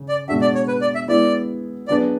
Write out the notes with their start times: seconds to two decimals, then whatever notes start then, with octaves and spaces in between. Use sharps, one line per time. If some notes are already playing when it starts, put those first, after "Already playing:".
Already playing: C#3
0.08 D5
0.28 B2 G#3 D4 F#4 E5
0.41 D5
0.55 C#5
0.68 B4
0.81 D5
0.95 E5
1.08 G#3 B3 E4 D5
1.88 F#3 B3 D4 G#4 B4 D5